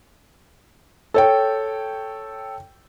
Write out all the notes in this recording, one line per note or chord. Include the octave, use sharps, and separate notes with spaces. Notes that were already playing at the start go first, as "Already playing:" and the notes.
A4 C#5 G5